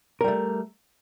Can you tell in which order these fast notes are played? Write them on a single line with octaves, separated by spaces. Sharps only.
A#4 G3 A3